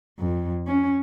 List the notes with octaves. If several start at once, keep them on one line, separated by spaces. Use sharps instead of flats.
F2
C#4